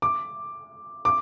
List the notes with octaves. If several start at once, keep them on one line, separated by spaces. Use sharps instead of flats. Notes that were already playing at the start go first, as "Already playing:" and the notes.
D6
D6